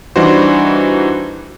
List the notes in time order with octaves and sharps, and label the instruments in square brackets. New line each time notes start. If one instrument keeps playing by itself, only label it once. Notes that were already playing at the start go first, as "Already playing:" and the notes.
[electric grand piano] E3 G3 D4 D#4 F#4 C5